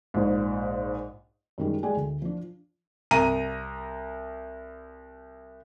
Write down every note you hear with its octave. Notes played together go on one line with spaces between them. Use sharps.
A#1 G#2
F#2 D#3 G3 G#3
G#3 G#4 A4 D5 G5 G#5
D2
F3 D4
C2 A#5 D#7